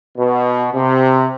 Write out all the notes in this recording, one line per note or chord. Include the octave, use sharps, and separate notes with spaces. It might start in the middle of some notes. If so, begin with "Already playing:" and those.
B2
C3